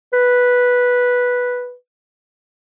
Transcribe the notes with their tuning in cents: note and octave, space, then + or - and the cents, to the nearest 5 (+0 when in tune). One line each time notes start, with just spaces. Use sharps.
B4 -5